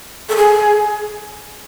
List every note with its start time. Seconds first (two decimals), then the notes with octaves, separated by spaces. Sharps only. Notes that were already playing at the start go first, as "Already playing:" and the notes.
0.29 A4
0.37 G#4